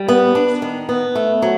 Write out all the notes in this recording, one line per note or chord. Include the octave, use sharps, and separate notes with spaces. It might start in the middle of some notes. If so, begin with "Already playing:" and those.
Already playing: G3
B3
D4
D#3
B3
A3
F#3